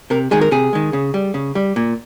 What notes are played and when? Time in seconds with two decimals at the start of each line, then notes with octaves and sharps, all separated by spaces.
0.10 C3 A#4
0.31 D#3 G#3 G#4
0.41 A#4
0.51 C3 G#4
0.73 D#3 G#3
0.93 C#3
1.14 G3
1.34 C#3
1.55 G3
1.76 A#2